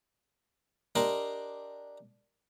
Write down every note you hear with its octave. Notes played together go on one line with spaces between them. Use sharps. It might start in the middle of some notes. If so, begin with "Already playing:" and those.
D4 G4 A#4 D#5 C6 D6